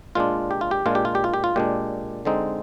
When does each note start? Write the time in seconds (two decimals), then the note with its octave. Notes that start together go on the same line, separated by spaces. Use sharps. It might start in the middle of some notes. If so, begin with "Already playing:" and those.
0.15 A#2 G#3 D4 F4
0.51 G4
0.61 F4
0.71 G4
0.86 A#2 G#3 D4 F4
0.95 G4
1.05 F4
1.15 G4
1.24 F4
1.34 G4
1.44 F4
1.56 A#2 G#3 D4 G4
2.25 D3 G#3 C4 D#4